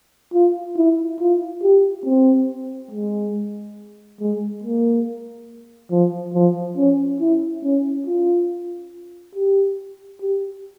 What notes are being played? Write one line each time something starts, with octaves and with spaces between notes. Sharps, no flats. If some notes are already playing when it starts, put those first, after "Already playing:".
F4
E4
F4
G4
C4
G#3
G#3
A#3
F3
F3
C#4
E4
C#4
F4
G4
G4